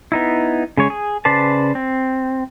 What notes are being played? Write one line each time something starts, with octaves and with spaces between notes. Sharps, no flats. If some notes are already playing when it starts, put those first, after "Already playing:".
B3 D#4 E4
C#3 G#3 C#5
G#4
C#3 B4 C5 D5 A5
C4